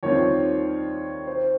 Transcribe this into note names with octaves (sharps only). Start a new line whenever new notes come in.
D#2 D#3 G3 C4 F4 C#5
C5